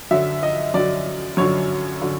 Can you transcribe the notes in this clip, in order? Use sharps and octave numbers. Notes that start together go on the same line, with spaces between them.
F#2 D3 F#3 E5
D#5
F#2 D3 F#3 D5
F#2 D3 F#3 C#5
D3 F#3